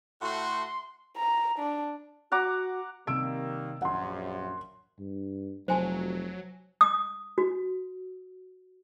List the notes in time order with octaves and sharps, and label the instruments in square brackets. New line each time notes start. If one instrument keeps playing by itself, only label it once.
[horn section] A2 A3 F#4 [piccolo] C6
[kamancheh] A#5
D4
[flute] F#4 [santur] F#5 A#5 D6
[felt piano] C3 E6 D7 [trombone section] D#3 G3 A#3
[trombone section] A#1 F#2 [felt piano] F#5 C6
[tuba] G2
[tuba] F1 [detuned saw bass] F#3 [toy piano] C5 G#5 A5
[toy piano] D#6
F#4